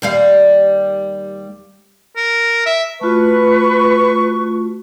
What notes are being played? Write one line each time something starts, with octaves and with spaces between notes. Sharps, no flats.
D#2 G3 F5
A#4
E5
A3 F4 F#4 B4 C#6